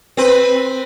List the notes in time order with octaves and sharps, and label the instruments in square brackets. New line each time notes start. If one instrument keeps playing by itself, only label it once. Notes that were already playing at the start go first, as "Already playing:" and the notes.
[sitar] C4 B4